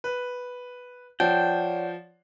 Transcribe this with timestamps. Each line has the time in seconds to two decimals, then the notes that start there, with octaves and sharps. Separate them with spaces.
0.04 B4
1.20 F3 C#5 D5 F#5 G5